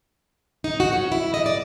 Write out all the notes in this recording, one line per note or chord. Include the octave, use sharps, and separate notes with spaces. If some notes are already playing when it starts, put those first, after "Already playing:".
D#4
F#4
C#4
E4
D#5
D5